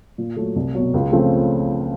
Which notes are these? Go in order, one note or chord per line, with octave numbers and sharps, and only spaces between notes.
A#2
F#3 A3
C2
B2 F#3
C#2
C#3 F3 A3 C4